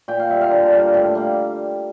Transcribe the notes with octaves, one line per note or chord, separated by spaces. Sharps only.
A#2 G5
F5
G3 A#3 E5
F5
D3
G3 A#3
A2 G5
G3 A#3